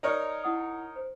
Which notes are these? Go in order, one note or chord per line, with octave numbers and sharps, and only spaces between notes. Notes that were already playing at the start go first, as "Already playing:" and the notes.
D#4 A#4 C#5 D5 A#5 F6
E4 F#5 D#6
C5